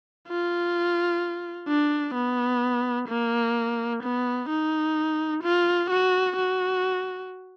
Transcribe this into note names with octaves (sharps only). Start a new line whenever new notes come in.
F4
D4
B3
A#3
B3
D#4
F4
F#4
F#4